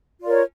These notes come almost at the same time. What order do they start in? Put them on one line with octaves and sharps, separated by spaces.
F4 D5 A#4 C#5